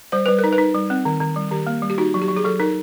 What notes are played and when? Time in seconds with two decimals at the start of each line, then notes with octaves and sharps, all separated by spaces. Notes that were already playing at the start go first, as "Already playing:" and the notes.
0.12 G3 C5
0.26 G3 B4
0.39 A#4
0.44 D#4
0.53 B4
0.58 D#4
0.75 G3
0.90 C4
1.05 D#3
1.20 D#3
1.36 G3
1.51 D#3 G4
1.67 A#3
1.82 G3
1.90 G4
1.98 D#4 F#4
2.14 F#3
2.22 G4
2.28 F#3
2.36 G#4
2.44 F#3 A4
2.59 D#4 A#4